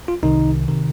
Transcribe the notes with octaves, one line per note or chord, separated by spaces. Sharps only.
F4
C2 C3 D#3 D#4
C3 D#3